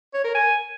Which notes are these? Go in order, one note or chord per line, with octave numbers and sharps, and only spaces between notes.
C#5
A#4
G#5